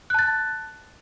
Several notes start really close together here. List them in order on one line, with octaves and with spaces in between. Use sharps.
F#6 A5 A6